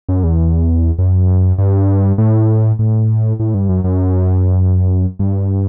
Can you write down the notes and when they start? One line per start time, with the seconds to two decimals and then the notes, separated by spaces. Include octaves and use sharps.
0.09 F#2
0.24 E2
0.98 F#2
1.58 G2
2.18 A2
2.79 A2
3.40 A2
3.54 G2
3.69 F#2
3.84 F#2
5.19 G2